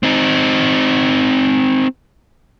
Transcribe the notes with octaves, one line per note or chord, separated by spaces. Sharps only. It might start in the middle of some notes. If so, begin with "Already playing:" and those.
C4 D#4